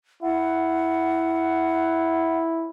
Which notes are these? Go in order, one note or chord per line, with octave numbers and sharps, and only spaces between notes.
E4 F#5